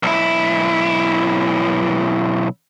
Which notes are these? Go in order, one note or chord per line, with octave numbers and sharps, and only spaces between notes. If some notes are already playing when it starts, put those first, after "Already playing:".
B1 E4